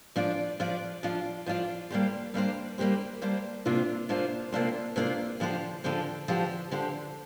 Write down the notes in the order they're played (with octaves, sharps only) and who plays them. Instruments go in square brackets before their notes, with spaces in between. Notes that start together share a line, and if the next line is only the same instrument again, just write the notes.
[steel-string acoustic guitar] F3 D4 F4 D5
F3 D4 F4 D5
F3 D4 F4 D5
F3 D4 F4 D5
G3 A#3 D4 G4 C5
G3 A#3 D4 G4 C5
G3 A#3 D4 G4 C5
G3 A#3 D4 G4 C5
C3 A#3 D4 F4 C5
C3 A#3 D4 F4 C5
C3 A#3 D4 F4 C5
C3 A#3 D4 F4 C5
D3 F3 D4 G4 C5
D3 F3 D4 G4 C5
D3 F3 D4 G4 C5
D3 F3 D4 G4 C5